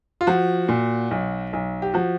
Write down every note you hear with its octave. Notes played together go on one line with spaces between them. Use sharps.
F4
F3 F#4
A#2
B1
B1
G4
F3 F#4